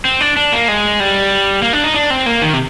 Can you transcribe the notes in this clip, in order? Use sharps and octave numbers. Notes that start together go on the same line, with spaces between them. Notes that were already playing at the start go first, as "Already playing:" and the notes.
C4
D4
D4
A#3
G#3
G3
A#3
D4
D#4
D4
C4
A#3
D#3
C3